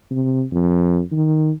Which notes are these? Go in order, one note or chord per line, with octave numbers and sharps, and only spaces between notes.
C3
F2
D#3